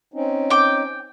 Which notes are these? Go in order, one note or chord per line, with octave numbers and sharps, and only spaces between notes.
C4 C#4 D#4
G5 D6